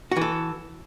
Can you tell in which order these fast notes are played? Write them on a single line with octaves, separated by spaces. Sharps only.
F#4 E3 A4